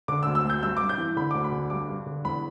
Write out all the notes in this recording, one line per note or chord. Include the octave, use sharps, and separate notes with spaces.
D3 D6
E6
D2
E6
D2
G6
G2 E6
D6
G2
G6
E3
D3 B5
D2 D6
B5
D3
G2 D6
G2
D3
E2 B5